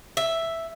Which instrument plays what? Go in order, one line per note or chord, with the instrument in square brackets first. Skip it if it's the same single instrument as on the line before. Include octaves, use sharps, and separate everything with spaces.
[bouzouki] E5